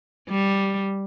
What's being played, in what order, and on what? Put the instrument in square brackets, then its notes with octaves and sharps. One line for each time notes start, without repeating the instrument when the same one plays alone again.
[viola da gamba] G3